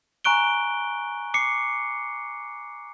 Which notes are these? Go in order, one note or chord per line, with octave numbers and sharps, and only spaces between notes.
G#5 A#5 C#6 F#6 D7 G7
D6 C7 C#7